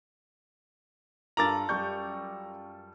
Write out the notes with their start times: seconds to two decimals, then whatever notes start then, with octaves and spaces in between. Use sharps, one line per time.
1.37 G2 F4 A4 A#4 A#5 D6 A6 F#7
1.69 F#2 G3 C#6 G6